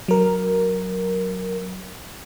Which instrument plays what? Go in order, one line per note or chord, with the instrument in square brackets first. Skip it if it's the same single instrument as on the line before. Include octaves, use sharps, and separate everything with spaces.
[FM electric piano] F#3 A#4